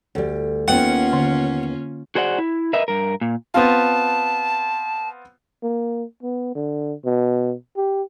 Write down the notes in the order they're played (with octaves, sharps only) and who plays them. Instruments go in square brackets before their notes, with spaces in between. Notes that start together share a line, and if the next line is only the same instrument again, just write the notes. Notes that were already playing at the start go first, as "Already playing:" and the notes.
[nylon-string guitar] D2 G3
[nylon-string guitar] D#2 B3 D#4 [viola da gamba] A#3 C#4 F4 [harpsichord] F#5 [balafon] G5
[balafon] D3
[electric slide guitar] F#4 G#4 C5 D5 F#5
E4
A#4 B4 D#5 E5
G2 A#4
A#2
[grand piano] B3 C4 F4 [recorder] A5
[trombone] A#3
B3
D3
B2
G4